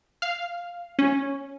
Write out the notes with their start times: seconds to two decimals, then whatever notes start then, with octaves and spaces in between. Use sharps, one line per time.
0.22 F5
0.99 C#4